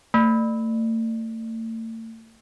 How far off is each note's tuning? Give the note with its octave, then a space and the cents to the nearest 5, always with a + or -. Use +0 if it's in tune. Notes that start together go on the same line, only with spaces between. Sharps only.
A3 +40